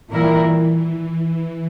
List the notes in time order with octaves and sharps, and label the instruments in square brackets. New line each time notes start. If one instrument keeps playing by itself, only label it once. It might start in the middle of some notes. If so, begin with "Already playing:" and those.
[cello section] A#2 G3 A#3 E4 A#4 [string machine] E3